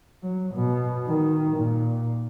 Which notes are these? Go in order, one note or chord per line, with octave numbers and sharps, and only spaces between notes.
F#3
B2
D#3
A#2